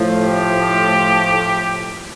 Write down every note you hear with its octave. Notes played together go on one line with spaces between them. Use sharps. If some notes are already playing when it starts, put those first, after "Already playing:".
Already playing: A2 F3 A3
G4